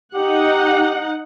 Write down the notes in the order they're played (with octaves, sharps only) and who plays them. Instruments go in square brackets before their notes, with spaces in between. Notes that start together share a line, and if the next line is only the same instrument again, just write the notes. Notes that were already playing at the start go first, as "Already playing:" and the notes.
[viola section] D#4 F#5 [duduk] G4